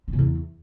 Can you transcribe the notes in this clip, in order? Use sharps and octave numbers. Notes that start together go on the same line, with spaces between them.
D3
C3
E2